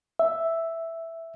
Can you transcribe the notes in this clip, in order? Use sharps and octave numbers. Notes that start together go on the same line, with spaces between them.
E5